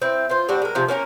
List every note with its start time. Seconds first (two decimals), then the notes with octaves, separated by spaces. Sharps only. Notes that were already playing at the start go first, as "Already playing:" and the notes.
0.02 C4 E4
0.29 F4 C5
0.49 G3 C4 D4 F#4
0.62 G#3 A#4
0.75 C3 F3
0.88 A#3 C#4 F#4 A#4